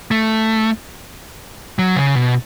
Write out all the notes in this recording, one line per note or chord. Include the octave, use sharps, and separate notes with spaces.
A3
F#3
C#3
B2